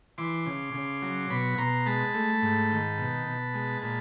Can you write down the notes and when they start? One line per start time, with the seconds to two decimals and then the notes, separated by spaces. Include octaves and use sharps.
0.18 E3 C6 D6
0.46 C#3
0.74 C#3
1.02 F#3
1.30 B2 B5 C#6
1.58 B2 A#5 C6
1.86 G#3 A5 B5
2.14 A3
2.42 G#2
2.70 D#3
2.98 B2
3.26 B2
3.54 G#3
3.82 A#2 A5 B5